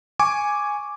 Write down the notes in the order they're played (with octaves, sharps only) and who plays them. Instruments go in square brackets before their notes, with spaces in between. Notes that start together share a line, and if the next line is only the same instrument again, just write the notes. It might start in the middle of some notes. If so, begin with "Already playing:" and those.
[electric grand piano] G#5 C#6 D6